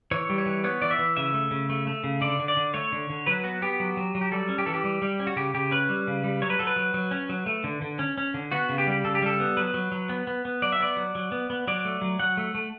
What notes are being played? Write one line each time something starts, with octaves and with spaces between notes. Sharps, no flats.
E3 C#5
G3
C#5
E3
B3 C#5
E3 D5
E5
E3
C#3 E5
A3
C#3
A3
A3
C#3
D3 D5
D3
D5
D3
A3 C#5
D3
D3
F#3 B4
B3 F#4
B3 G4
F#3
F#3
F#3
G4
G3 A4
C#4
G4
E3 A4
G4
G3
G3
C#4
F#4
C#3 G4
C#3 G4
C#4 B4
G3
C#3
G3
F#3 C#5
B4
F#3 A4
B4
F#3
F#3
C#4
F#3
A3
D3
D3
C#4
C#4
D3
B3 F#4
C#3
G4
G3
C#3 A4
G4
G3 A4
B3
F#3 B4
F#3
F#3
B3
B3
B3
F#3 D5
E5
B3 D5
F#3
F#3
B3
B3
F#3 D5
A3
F#3
F#3 F#5
A3
A3